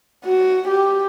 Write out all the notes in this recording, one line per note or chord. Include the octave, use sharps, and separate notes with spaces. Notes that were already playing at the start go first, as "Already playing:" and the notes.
F#4
G4